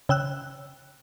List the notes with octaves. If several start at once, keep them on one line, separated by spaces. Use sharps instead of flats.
C#3 G5 E6 F#6